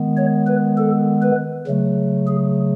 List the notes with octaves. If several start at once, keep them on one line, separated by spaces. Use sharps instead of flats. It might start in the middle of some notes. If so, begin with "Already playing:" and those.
Already playing: D#3 G#3 B3
C#5
B4
A4
B4
C#3 F#3 A3
G#4